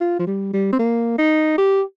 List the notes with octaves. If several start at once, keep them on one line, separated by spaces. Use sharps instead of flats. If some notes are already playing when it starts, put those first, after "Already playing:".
F4
F3
G3
G3
C4
A#3
D#4
G4